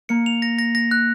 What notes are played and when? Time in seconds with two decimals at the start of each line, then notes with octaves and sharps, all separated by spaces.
0.09 A#3 C#7
0.26 F7
0.42 A#6
0.59 A#6
0.75 A#6
0.91 F#6